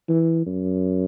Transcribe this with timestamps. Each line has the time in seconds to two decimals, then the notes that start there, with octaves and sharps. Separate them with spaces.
0.09 E3
0.47 F#2